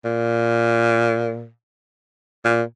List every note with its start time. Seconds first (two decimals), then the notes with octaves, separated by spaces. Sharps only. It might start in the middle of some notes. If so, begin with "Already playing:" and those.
0.04 A#2
2.44 A#2